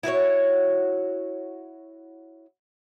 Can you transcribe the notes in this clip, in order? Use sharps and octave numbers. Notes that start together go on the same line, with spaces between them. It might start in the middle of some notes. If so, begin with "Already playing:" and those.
E4 F#4 B4 C#5